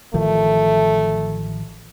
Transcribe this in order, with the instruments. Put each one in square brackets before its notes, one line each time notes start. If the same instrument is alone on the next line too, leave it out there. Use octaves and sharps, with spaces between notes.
[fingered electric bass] A1 D#3 F3 [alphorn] A3